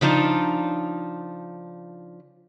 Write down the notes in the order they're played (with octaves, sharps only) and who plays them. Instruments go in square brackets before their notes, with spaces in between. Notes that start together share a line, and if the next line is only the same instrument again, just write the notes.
[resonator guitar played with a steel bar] C#3 F3 D4 D#4